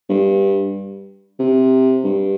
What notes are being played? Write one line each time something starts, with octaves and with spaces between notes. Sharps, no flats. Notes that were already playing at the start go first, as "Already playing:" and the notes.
G2
C3
G2